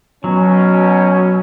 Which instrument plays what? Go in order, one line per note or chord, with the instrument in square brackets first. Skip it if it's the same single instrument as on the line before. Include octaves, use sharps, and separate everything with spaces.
[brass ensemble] B2 C#4 [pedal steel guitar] F#3